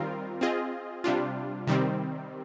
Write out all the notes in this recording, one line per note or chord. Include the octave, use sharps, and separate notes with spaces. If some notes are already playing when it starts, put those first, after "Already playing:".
Already playing: D#3 G3 C4 F4 A#4
C4 F4 G#4 D#5
C3 G3 D4 F4
C3 D#3 G3 C4